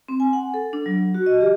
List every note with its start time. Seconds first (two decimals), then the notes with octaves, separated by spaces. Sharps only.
0.08 C4
0.20 G#5
0.33 F#5
0.54 A4
0.73 D4
0.86 F#3
1.14 F#4
1.26 D#5
1.41 G4